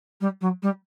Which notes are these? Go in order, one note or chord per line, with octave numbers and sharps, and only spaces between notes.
G3
F#3
G3